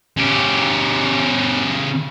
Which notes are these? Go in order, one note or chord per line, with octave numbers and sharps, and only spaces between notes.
C#3 G4